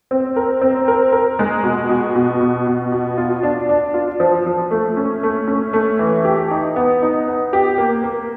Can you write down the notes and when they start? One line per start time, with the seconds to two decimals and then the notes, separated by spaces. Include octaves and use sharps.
0.11 C4
0.36 A#4
0.61 C4
0.88 A#4
1.12 A#4
1.39 G#3
1.64 B2
1.89 B2
2.15 B2
2.41 B2
2.67 B2
2.92 B2
3.18 F4
3.43 D4
3.69 D4
3.94 F4
4.20 F3
4.46 F3
4.71 A3
4.97 C#4
5.23 A3
5.48 C#4
5.73 A3
5.99 E3
6.25 G4
6.51 D#4
6.76 B3
7.02 D#4
7.27 B3
7.53 G4
7.78 A#3
8.04 A#3